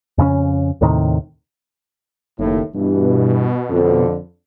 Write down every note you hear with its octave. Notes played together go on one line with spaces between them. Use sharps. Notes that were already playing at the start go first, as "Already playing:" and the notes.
F2 C#3 C4 C#4
D#2 A2 C3 D#3
F#1 D#2 A2
G2 B2 E3
F2 D3